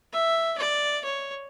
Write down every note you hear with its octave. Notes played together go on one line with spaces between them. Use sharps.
E5
D5
C#5